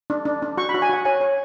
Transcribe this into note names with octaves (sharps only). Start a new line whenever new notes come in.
D4
D4
D4
F#4 C#6
B5
F#4
G#5
F#4 F#5
C#5 G#5
C#5